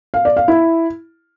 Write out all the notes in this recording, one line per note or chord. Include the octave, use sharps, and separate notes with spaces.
F5
D5
F5
E4